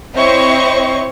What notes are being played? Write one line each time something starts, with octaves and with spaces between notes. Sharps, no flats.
C4 E4 C5 C#5 D#5 C#6